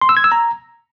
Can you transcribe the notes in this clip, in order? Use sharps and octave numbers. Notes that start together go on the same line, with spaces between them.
C6
E6
G#6
E6
A#5